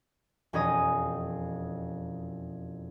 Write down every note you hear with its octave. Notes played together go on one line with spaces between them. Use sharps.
E1 F2 C#4 G#4 D#5 D#6